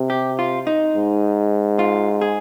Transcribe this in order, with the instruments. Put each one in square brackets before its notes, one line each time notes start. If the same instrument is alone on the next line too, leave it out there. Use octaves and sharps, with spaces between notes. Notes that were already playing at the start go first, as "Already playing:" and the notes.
Already playing: [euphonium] C3
[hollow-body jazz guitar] G4
F4
D#4
[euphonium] G#2
[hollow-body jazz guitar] F4
G#4